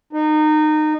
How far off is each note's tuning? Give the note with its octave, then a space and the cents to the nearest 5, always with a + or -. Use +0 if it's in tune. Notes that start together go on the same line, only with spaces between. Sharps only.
D#4 -25